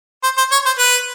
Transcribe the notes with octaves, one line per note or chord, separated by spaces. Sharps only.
C5
C5
C#5
C5
B4